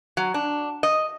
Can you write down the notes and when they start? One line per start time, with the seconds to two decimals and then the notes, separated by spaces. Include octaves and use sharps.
0.17 F#3
0.34 D4
0.83 D#5